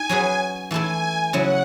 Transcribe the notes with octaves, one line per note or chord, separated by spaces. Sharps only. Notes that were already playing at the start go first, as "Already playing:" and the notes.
Already playing: D#4 G#5
F#3 C#4 G#4 B4
E3 A3 E4 A4 G#5
C#3 F#3 C#4 E4 F#5